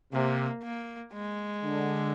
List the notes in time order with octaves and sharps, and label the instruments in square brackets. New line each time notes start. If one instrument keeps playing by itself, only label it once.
[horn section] C3 [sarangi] A#3
[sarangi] A#3
G#3
[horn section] D3